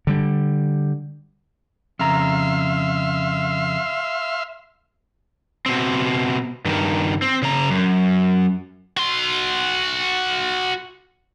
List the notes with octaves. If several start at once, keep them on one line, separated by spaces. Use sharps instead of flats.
D3 G3
F2 C#3 E5 F5 A#5 C6
B2 C4
G2 D#3
C4
C#3 A#5
F#2
F#4 C6